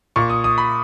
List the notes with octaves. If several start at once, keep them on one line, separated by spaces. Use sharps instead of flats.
A#2 C#6
D#6
D#6
B5